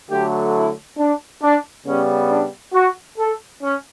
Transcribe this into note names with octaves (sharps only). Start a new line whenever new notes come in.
D3 F#3 A3 G4
E4
D4
D4
C#3 G3 B3 C#4
D4
F#4
A4
C#4